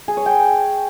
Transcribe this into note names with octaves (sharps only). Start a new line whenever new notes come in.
G#4
C#5
G5